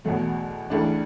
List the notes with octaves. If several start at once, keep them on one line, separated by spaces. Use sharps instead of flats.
E2 B2 F#3 A3
C#2 C#3 E3 A3 D4